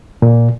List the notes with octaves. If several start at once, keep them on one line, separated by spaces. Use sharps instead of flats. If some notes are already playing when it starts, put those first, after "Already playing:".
A#2